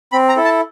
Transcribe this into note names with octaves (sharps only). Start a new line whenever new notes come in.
C4 B5
A#5
E4 A4
A5